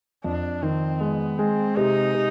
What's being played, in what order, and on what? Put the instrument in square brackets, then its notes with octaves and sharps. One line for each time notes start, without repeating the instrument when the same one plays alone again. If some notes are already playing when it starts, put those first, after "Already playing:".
[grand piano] F2 [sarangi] D4
[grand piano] D#3 [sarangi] C4
[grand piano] G#3 [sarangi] B3
[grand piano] G#3 [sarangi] C4
[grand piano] C3 [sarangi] D#4
[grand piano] C3